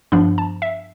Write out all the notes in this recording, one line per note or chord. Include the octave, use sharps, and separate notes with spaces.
G2 F3 B3 D4 B5
A5
E5